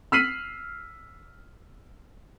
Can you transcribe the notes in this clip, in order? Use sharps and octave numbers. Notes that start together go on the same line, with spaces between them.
E6 F6 B6 C7 D#7 F#7